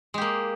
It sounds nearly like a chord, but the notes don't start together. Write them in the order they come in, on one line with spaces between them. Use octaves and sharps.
G#3 G4 A#3